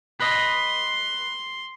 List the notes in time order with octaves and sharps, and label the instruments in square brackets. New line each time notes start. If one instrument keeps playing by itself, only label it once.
[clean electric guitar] B4 D#5 [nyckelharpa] C6